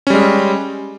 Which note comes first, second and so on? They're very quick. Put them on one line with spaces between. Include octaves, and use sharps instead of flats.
C#4 G3 G#3